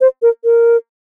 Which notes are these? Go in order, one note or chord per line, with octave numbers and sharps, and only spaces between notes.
C5
A#4
A#4